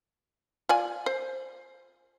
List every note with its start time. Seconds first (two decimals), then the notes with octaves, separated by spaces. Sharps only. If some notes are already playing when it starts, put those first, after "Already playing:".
0.69 F4 D5 G#5
1.06 C5